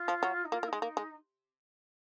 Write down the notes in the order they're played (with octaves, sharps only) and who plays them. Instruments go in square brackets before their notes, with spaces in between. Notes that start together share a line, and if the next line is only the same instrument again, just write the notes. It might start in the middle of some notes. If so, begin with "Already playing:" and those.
Already playing: [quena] F4
[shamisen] F3
F#3
[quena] D#4
[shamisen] A#3 [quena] F4
[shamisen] A#3
[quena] D#4
[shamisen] G#3
A#3
G#3